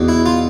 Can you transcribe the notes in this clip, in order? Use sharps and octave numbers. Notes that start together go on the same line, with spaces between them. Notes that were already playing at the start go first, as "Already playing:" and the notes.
Already playing: E2 B2
E4
F4